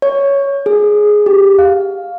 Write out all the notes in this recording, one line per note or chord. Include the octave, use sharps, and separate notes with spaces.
C#5
G#4
G4
F5